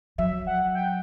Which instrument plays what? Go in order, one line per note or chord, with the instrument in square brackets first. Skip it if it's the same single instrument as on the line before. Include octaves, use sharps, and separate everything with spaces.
[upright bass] F#3 [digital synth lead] E5
[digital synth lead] F#5
G5